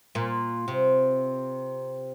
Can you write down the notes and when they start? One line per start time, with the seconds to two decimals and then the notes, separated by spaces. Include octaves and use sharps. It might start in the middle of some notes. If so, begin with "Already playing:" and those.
0.15 A#2
0.68 C3